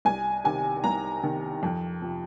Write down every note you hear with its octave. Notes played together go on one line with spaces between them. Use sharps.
C2 G#5
C3 D#3 G#5
C2 A#5
C3 D#3
F2
C3 F3